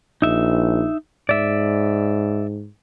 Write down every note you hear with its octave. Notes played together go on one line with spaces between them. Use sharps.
A#1 D#4 E5
G#2 D5 E5